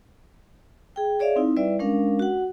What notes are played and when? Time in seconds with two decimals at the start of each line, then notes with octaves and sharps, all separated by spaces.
0.96 G#4 G5
1.19 G#4 C#5 D5 E5 F5
1.36 C4 D#4 E4
1.57 G3 E4 B4 D5 E5
1.79 G#3 C#4 D4 A#4 F5
2.19 F#4 F#5